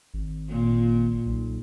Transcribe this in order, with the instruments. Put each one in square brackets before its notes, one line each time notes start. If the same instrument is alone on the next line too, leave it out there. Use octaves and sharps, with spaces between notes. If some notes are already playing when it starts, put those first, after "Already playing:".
[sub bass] G#1
[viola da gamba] A#2
[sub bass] B1